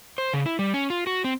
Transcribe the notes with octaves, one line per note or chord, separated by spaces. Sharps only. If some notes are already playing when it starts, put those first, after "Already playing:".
C5
C#3
E4
G3
C#4
F4
F#4
C4